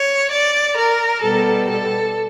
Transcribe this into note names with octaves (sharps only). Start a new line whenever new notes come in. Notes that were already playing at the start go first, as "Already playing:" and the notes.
Already playing: C#5
D5
A#4
B2 G3 B3 A4
A4